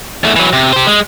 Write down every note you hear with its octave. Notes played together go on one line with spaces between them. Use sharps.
E2 A3
E3 F#3
C3
G4 C5
G#3